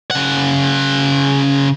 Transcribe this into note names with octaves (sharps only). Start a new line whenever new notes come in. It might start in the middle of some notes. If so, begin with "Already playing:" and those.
C#3 F#5